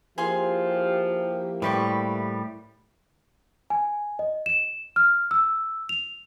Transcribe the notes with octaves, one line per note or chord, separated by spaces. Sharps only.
F3 A#3 E4 G4 G#4 F5 C6
A2 G3 B4 C5 C#6
G#5
D#5
E7
F6
E6
F7